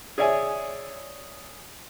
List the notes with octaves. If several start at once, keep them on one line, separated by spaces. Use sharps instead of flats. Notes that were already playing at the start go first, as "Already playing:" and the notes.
G#4 C#5 D5 E5 G#5